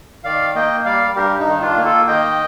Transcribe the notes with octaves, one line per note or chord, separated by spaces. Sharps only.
D#3 D5 F5
A#3 D#5 G5
G3 D5 F5
G2 G4 A#4
D#4
D#3
D4 F4
A#3
F4 A4
D#3 D#5 G5